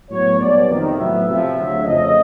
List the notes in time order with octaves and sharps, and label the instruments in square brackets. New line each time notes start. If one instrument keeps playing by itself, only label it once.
[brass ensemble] A2 F#3 B3 C#5
B1 B2 G3 B3 D5
F2 C3 D#3
A2 F#3 B3 E5
F2 C3 F3 E5
D2 C#3 F#3
F2 C#3 F3 A3 C#4 D#5